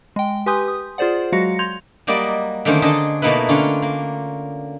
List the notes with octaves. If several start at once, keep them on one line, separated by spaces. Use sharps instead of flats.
G#3 G5
G4 B4 G#5 C6 D#6 G6
D#6
F4 G#4 C5 D5 F#5
F#3 G#3 F#4 F5 A#6 C#7
C6 G6 G#6 F7
F#3 G3 A#3 D5 D#5
D3 D#3 A3 A#3 C#4 C5
D3 G#4 A4 D#5 A5
B2 A3 A#3 D#4 E4 B4
D3 C#4 F4
A#3